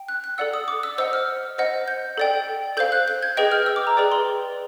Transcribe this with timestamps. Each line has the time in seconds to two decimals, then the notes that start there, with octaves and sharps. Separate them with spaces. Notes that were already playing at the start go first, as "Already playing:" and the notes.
Already playing: G5
0.08 F#6
0.24 F#6
0.38 A4 D5 F#5 E6
0.54 D#6
0.68 D6
0.83 E6
0.98 C5 D#5 F#5 E6
1.13 F6
1.58 C5 D#5 F#5
1.88 G6
2.18 A4 D5 G5
2.77 A4 C5 F5 G6
2.92 F#6
3.08 G6
3.23 G#6
3.37 G#4 B4 D#5 G5 G6
3.52 F6
3.66 E6
3.76 D6
3.87 A#5
3.97 G#4 B4 D5 G5
4.12 C6